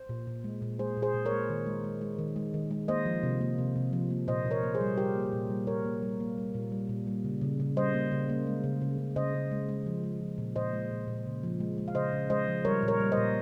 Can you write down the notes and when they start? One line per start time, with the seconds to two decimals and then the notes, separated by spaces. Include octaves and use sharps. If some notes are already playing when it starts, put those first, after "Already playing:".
Already playing: C5
0.09 A#2
0.27 A#2
0.44 G#3
0.62 A#2
0.79 G#3 G#4 C5
0.97 A#2
1.02 G#4 C5
1.14 A#2
1.25 A#4 C#5
1.31 G#3
1.50 D#3
1.66 G#3
1.84 G#3
2.01 G#3
2.19 D#3
2.36 G#3
2.54 D#3
2.71 G#3
2.88 A#3 C5 D#5
3.06 F3
3.23 C3
3.41 A#3
3.58 C3
3.76 C3
3.93 F3
4.10 A#3
4.28 A#2 C5 D#5
4.45 A#2
4.51 A#4 C#5
4.63 A#3
4.74 G#4 C5
4.81 G3
4.98 G3 G4 A#4
5.15 A#3
5.32 A#2
5.50 G3
5.67 A#2 A#4 C#5
5.85 A#3
6.02 G3
6.20 A#3
6.38 G3
6.54 A#2
6.72 G3
6.89 A#2
7.07 G3
7.24 C#3
7.41 C#3
7.60 C#3
7.77 G3 C5 D#5
7.94 A#3
8.11 C#3
8.30 A#3
8.47 G#3
8.64 C#3
8.82 C#3
8.99 C#3
9.16 C#3 C5 D#5
9.34 C#3
9.51 G#3
9.69 G#3
9.86 F3
10.04 G#3
10.21 F3
10.38 A#2
10.56 A#2 C5 D#5
10.73 G#3
10.91 A#2
11.08 A#2
11.26 C#3
11.43 F3
11.60 G#3
11.78 G#3
11.88 F5
11.95 C#3 C5 D#5
12.13 C#3
12.30 G#3 C5 D#5
12.48 F3
12.65 G3 A#4 C#5
12.83 A#2
12.88 A#4 C#5
13.00 G3
13.12 C5 D#5
13.17 A#2